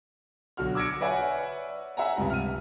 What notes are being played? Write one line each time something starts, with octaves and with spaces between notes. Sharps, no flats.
B1 D3 F#4 F6
D6 E6 G#6 A#6 C#7 D7
B4 C#5 D5 E5 F#5 G#5
E5 F#5 G#5 A#5
C#2 G2 C3
F6 D#7